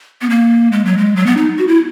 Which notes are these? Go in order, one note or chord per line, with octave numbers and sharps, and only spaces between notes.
B3
A#3
G#3
F#3
G#3
F#3
B3
D#4
F#4
E4